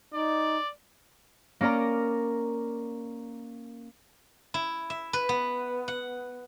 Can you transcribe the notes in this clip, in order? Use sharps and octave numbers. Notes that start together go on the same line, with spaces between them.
D#4 D5
A#3 C#4 A#4 D5 A#5
E4
E5
B4
B3
F#5